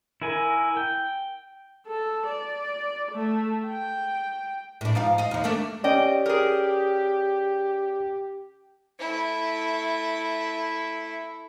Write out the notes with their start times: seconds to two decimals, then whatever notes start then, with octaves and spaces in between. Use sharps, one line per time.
0.22 E4 A#4 G#5
0.77 G5
1.87 A4
2.27 D5
3.12 A3
3.66 G5
4.81 A2 D4
4.95 G#2 F3 F5
5.18 D#5 F5
5.31 D#2 F3
5.44 A3 A#3 D4
5.84 C#4 G4 D5 D#5 G5
6.26 G#4 A#4
8.99 A3 E4